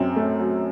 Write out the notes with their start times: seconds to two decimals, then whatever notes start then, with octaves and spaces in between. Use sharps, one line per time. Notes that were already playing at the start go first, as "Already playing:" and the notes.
Already playing: F#2 C4
0.16 A3
0.39 F#3